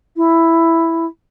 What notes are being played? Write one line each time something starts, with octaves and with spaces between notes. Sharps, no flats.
E4